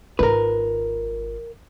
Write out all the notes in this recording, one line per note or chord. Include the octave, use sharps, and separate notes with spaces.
G#1 F4 A#4 B4